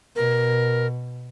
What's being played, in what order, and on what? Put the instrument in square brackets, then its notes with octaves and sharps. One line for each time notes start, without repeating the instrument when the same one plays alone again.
[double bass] B2 [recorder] A#4